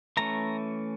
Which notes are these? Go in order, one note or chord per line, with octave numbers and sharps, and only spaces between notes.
E3 A3 C#4 A#5